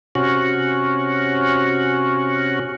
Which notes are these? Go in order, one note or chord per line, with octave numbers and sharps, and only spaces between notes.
C3 C#4 F#4